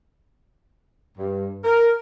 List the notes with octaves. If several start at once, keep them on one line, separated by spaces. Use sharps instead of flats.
G2
A#4